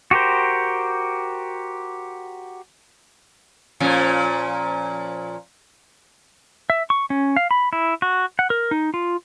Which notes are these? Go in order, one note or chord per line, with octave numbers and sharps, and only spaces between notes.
F#4 G4 A#4 C5
A#2 F3 C#4
E5
C#6
C#4
F5
B5
E4
F#4
F#5
A#4
D#4
F4